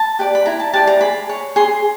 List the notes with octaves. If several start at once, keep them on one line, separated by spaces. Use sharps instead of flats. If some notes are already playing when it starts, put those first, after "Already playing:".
Already playing: A5
G4 B4 D5
B5
E4 A#5
A5
G4 B4 D5 A5
A#5
G#4 B5
C#5
G#4 C6